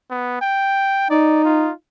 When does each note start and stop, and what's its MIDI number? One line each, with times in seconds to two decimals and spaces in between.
0.10 0.40 59
0.41 1.10 79
1.10 1.70 63
1.10 1.43 74
1.45 1.72 65